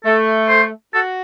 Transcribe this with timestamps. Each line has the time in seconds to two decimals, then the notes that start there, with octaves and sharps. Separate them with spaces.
0.05 A3 A4
0.49 C5
0.93 F#4 A4